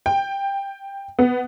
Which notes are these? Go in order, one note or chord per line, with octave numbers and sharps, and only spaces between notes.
G5
B3